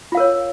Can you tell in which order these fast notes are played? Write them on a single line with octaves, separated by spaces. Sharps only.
F4 F5 A#4 C#5